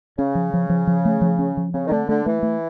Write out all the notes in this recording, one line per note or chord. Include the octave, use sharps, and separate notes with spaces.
C#3 C#4
F3
F3
F3
F3
A3
F3
C#4
F3
C#3 C4
D#3
D3 A3
D3 A3
E3 A3
A3